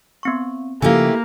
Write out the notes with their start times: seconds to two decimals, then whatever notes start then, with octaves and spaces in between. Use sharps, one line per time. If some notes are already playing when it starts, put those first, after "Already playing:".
0.23 B3 C4 C#6
0.82 C#3 F3 A3 A#3 E4 G4 F5 G#5